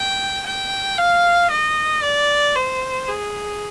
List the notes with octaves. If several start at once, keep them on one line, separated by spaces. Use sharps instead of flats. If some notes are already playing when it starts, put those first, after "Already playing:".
Already playing: G5
G5
F5
D#5
D5
C5
G#4